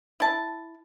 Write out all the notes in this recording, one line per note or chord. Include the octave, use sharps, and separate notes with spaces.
E4 A5